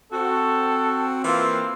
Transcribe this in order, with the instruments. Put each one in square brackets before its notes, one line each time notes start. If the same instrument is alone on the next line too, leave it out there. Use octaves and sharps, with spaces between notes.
[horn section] C4 F#4 [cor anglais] A4
[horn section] E3 A#3 F4 [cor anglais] C4